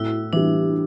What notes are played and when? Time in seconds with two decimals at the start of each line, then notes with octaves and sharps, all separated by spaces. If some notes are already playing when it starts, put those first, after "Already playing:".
Already playing: A2 E4 F#4
0.33 E3 G3 D4